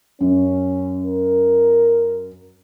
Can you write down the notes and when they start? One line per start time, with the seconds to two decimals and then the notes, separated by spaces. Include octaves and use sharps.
0.21 F#2 C#4
1.06 A#4